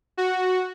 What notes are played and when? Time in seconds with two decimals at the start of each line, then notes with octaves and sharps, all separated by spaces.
0.17 F#4